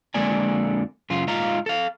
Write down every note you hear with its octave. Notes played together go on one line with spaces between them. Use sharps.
F2 D3 G#3 A#3 D5 G#5
F#2 C#3 F4
G#2 D#4 F4 F5 A#5
A4 F5